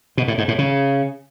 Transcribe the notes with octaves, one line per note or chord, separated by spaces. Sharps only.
B2
A2
G#2
A2
C#3